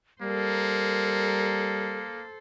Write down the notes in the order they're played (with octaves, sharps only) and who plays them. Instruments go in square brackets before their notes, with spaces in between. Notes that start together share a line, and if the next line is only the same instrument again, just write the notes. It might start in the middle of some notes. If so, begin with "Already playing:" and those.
[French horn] G3 [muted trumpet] A#3 [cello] A4 C5 [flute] A#4